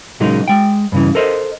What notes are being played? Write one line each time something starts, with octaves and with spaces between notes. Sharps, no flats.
A#2 C#3 F#3 G#3 A#3 D#4
G#3 G5
G2 C#3 E3
A4 A#4 C5 D#5